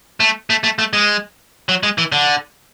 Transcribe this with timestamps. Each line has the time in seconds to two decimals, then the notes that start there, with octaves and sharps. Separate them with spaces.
0.20 A3
0.50 A3
0.64 A3
0.79 A3
0.93 G#3
1.69 F#3
1.83 G#3
1.98 E3
2.12 D3